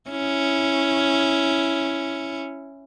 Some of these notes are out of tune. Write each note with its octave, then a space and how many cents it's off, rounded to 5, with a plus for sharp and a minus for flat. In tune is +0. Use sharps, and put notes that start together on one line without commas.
C#4 +0 E4 +0